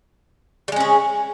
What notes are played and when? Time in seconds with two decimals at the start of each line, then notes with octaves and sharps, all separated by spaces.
0.68 G3
0.72 G#3
0.76 C#4
0.80 G#4